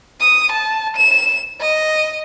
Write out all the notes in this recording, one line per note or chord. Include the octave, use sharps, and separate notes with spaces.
D#6
A5
E7
D#5